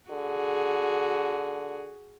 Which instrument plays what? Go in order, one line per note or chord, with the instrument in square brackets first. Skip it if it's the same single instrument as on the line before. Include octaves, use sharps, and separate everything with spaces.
[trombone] D3 [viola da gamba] F#4 G#4